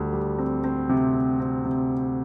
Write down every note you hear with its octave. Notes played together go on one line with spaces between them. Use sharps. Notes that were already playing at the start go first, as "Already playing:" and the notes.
Already playing: D2 G3
G3
C4
C4
C3
C4
C4
C3